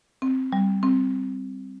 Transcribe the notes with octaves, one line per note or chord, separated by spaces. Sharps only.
C4
G3
C4